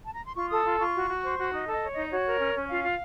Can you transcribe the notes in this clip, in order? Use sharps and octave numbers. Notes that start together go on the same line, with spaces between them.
A5
A#5
C6
F4 C#6
A4 D#6
F4
F4 C#6
F#4
F#4
C5
F#4
D#4 D#5
A4
D#5
C#5
D#4 D#5
D#5
F#4 C#5
A#4
C#4
C#4
F4 F5
F4